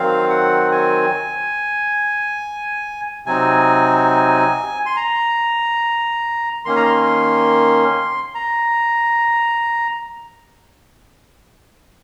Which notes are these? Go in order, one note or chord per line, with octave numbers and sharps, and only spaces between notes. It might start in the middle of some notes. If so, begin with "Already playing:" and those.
Already playing: D#3 F#3 C4 F5
F#5
G#5
C3 F#3 C4 D#4 G#5
C6
A#5
D#3 A#3 C#4 C6
A#5
C6
A#5